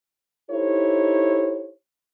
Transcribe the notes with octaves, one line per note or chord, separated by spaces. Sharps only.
D#4 E4 G4 A4 C5 C#5